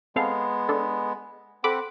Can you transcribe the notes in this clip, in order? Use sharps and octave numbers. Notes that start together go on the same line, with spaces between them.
G#3 B3 C4 A4 F5
D4 A4
C4 A4 F#5 B5 D6